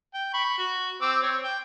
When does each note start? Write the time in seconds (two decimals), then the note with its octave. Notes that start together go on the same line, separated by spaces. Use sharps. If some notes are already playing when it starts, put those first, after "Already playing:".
0.14 G5
0.34 B5 C#6
0.59 F#4
1.02 C4 D6 E6
1.22 C4 C#5
1.44 G5